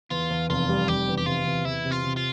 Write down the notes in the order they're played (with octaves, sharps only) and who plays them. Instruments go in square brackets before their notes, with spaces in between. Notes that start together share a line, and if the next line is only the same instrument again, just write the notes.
[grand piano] E2 [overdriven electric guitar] F4
[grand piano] E2
[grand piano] F1 [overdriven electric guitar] F4
[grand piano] G3
[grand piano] F1 [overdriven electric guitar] G4
[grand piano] E2
[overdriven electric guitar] G4
[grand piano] C3 [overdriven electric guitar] F4
[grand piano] E2
[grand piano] E2 [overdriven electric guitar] E4
[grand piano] C3
[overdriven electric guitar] F4
[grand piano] C3
[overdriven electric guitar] F4